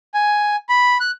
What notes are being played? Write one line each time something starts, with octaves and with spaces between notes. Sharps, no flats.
G#5
B5
F#6